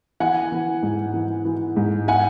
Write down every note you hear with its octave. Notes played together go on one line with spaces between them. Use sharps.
E3 F#5 G#5
E3
G#2
E3
E3
G#2
F#5 G#5